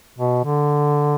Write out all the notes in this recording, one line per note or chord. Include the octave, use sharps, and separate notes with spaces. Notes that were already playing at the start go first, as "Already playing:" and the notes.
B2
D3